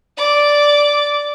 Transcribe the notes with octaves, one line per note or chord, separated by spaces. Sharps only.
D5 D6